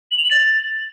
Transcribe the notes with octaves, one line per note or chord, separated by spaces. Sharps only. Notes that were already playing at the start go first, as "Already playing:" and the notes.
F#7
F7
F#7
A6